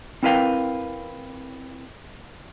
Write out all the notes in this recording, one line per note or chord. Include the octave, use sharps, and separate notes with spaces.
C4 E4 A#4 B4 F5 G5